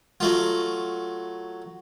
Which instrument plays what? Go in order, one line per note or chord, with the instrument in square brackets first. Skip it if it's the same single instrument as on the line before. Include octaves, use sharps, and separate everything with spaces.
[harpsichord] F#3 A3 F4